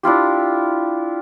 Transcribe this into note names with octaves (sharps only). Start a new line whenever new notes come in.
D4 E4 F4 G4